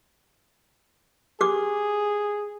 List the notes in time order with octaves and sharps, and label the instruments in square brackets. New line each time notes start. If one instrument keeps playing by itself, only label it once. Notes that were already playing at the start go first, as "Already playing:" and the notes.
[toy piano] G4 D6 [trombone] G#4